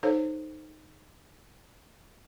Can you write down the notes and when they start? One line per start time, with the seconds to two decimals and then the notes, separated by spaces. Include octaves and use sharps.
0.03 D#4 A4 C5 C#5